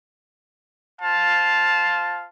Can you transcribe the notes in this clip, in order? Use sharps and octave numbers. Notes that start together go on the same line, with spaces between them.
F4 C5 F5 A5